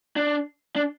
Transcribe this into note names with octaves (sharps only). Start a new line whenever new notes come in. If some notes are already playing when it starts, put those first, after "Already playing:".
D4
D4